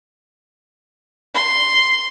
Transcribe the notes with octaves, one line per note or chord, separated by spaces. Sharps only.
C6